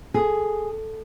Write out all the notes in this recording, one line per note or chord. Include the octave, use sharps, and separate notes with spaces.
G#4 A4